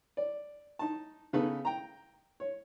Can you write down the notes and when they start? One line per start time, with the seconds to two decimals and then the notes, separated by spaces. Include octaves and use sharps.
0.17 D5
0.79 D#4 A5
1.33 C#3 B3 D#4 G#4 A4 B4
1.65 G5 A#5
2.40 C#5